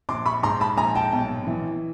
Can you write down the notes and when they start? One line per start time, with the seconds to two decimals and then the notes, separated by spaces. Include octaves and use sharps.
0.09 A#1 C6 D6
0.26 B5 C#6
0.43 G#2 A#5 C6
0.60 A5 B5
0.77 A#1 G#5 A#5
0.95 G5 A5
1.13 B1
1.47 E3